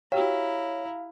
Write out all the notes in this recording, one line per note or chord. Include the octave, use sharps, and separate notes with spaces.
E4 F#4 G4 C#5 F5 G5 A#5